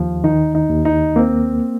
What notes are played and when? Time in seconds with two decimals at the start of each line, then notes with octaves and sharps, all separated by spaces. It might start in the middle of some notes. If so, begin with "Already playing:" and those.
Already playing: D#2 F3
0.24 D#3 D#4
0.55 D#4
0.69 D#2
0.85 D#4
1.16 A#3 C4